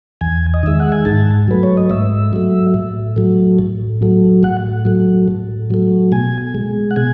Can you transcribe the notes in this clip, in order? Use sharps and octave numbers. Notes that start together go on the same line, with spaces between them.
E2 G#5
D#5
D#3 G#3 E5
F#5
G#5
G#2 A5
F#3 A3 B4
C#5
D#5
G#2 E5
F#3 A3
A2
F#3 A3
A2
F#3 A3
A2 F#5
F#3 A3
A2
F#3 A3
B2 G#5
G#3
F#5
B2 G#5